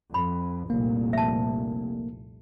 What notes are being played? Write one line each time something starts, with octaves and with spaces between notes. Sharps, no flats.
F2 B5
F1 C2 A#2 A#3
E5 A5